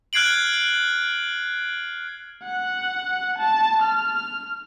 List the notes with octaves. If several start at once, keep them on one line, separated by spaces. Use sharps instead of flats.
F6 F#6 G#6 C7 D7 F#7
F#5
A5
F6